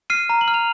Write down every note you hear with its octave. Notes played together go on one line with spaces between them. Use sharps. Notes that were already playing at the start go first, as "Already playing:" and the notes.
F6 C7 D#7
A#5
F#7
F6
F7